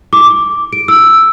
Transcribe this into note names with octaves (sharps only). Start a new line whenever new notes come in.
D6
D7
E6